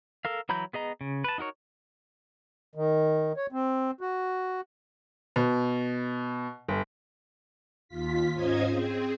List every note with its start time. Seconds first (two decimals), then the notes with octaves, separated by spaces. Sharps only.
0.25 A4 A#4 F5
0.49 E3 F#3 A#5 B5 G6
0.73 B3 G#4 D#5 A#5
1.01 C#3
1.24 B4 A5
1.38 D#4 F#4 A#4 C#5
2.75 D#3
3.37 C#5
3.52 C4
4.01 F#4
5.36 B2
6.68 G1
7.88 D#2 F4 B6
8.33 G#2 C#4 F4 C5 D#5 G#6
8.69 C4 G#4